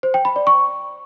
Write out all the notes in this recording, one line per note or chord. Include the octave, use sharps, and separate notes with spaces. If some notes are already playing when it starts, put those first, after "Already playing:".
C5
G5
B5
D5
C#6